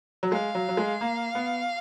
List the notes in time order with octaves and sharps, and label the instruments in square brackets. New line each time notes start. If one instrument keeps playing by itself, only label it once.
[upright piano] F#3
[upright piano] G#3 [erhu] F5
[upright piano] F#3
F#3
G#3
A#3
B3